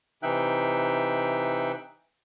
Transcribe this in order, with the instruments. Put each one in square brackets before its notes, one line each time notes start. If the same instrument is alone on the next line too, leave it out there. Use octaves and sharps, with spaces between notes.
[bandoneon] C3 E3 D#4 E5 G5 F#6